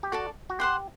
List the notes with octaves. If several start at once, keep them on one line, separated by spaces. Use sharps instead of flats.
G4
F#4 A4 D5 A5
F#4
G4 C5 F#5 C6